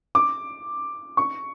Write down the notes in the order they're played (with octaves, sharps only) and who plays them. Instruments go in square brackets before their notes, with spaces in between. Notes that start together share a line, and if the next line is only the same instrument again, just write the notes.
[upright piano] D6
C#6